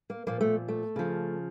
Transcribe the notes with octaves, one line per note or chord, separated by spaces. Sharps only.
A#3
A#2 F3 A#3
A3
A3
C#3 F3